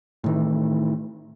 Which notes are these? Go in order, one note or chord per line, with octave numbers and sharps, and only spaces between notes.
A2 D#3 E3